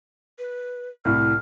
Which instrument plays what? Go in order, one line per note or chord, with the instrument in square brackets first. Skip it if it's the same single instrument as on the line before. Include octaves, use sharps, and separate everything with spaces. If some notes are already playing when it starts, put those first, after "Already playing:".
[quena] B4
[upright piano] C2 A2 [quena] F6